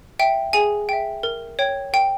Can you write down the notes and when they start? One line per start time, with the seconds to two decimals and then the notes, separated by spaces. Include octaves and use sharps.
0.19 E5 G5
0.53 G#4 G#5
0.89 E5 G5
1.23 A#4
1.59 C#5 G5
1.93 A#4 G5